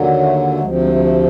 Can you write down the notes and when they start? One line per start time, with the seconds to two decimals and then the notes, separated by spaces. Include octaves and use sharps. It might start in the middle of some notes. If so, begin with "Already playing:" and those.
Already playing: D#2 D3 F#3
0.18 A3
0.51 A3
0.60 D2 C3 F3 G#3
0.81 G#3
0.95 G#3
1.02 A3